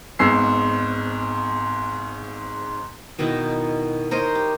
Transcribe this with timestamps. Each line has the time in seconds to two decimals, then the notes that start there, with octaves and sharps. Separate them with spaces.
0.19 G#1 G#2 B3 E6 C7
3.19 B2 D#3 D#4 E4
4.11 A#4 C5 C#5 D#5
4.35 G4